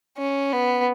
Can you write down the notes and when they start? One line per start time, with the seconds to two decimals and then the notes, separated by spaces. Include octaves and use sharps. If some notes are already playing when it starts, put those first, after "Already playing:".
0.18 C#4
0.53 B3